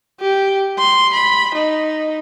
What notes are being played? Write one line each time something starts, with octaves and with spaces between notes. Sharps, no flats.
G4
C6
B5
D#4